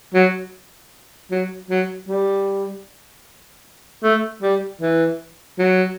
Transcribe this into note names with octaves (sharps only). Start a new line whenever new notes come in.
F#3
F#3
F#3
G3
A3
G3
E3
F#3